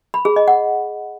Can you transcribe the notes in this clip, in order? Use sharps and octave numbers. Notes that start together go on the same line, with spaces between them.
B5
G#4
D#5
F#5